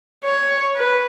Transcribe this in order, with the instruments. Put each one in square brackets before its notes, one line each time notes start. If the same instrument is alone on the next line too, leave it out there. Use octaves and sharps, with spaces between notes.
[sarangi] C#5
B4